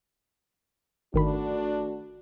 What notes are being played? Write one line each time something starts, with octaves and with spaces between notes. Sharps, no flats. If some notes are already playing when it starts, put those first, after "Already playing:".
G#1 D#3 A3 D4 F#4 B5